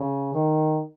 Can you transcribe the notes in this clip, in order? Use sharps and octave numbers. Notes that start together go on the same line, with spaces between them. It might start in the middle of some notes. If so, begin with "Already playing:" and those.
Already playing: C#3
D#3